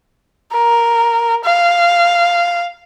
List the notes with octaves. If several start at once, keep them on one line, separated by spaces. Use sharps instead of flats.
A#4
F5